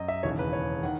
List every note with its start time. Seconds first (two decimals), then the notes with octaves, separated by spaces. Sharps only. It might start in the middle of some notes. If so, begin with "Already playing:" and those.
Already playing: F#2 D#5
0.08 E5
0.23 E1 D#2 C#3 E3 C#5
0.39 B4
0.53 C#5
0.83 D#3 F#5